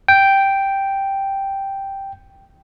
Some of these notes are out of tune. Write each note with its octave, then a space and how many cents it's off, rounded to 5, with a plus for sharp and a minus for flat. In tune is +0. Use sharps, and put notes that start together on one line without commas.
G5 +0